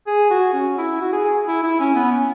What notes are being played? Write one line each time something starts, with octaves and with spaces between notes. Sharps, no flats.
G#4
F#4
C#4
E4
F#4
G#4
G#4
E4
E4
C#4
B3
C#4